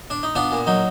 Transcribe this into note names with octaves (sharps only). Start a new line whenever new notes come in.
D4
D#4
B3 D4 F4
A#2
F#3 D#4